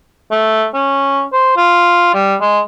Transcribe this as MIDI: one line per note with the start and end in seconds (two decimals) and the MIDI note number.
0.31 0.66 57
0.74 1.23 61
1.33 1.53 72
1.57 2.11 65
2.14 2.35 55
2.41 2.60 56